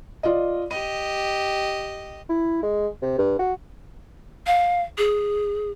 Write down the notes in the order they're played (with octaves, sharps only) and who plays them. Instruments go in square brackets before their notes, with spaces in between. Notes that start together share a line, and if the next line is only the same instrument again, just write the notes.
[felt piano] F4 D5 D#5
[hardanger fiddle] G4 D#5 [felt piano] D#7
[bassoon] E4
G#3
C3
G2
F#4
[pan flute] F5
G#4